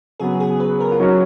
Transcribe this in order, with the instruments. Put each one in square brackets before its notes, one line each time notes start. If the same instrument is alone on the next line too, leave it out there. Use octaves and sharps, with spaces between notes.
[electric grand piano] C#3 F#3 B3 [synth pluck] G#4
[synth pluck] G#4
B4
A#4
F4
[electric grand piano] F#3 C#4 F#4 [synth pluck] D#4